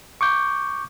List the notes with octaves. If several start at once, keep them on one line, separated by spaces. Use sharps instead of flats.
C#6 D6 G6